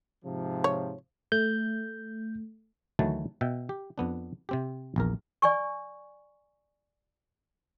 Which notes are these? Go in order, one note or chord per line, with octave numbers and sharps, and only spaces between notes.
G#2 C3 F3
C#5
A3 G6
D2 D#3 E3 F#3 A3 A5
B2 E5 G5
G4
F2 B3 D4
C3 C4 G4
A#1 E2 A#4
D5 G#5 C#6